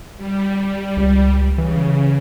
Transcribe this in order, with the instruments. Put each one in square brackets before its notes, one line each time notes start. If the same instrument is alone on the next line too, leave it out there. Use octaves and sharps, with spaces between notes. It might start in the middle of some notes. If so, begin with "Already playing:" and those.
[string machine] G3
[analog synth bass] C#2
[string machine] C#3 [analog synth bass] E3